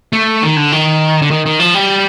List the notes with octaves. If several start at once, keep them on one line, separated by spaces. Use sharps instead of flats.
A3
D#3
D3
D#3
D3
D#3
D#3
F3
G3